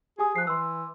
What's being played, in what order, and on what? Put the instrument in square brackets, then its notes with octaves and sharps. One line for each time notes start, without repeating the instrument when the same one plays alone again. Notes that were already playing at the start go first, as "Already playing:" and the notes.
[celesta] G4 G#5 D#6 [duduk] G#4
[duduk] F3 [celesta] F#6 C7
[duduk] E3 [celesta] C6 E6